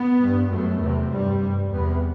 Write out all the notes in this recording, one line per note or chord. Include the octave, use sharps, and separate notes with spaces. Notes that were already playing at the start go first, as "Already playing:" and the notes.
Already playing: B3
G2
F#2 A3
E2 C3
G2 G3
G2
E2 C3 B3